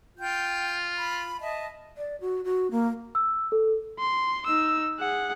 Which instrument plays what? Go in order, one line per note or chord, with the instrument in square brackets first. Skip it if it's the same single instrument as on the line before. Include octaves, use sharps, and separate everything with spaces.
[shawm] F4 [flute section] G5 G6
[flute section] B5
D#5 E5 A5
[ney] D5
F#4
F#4
A#3
[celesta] E6
A4
[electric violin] C6
D#4 E6
G#4 F#5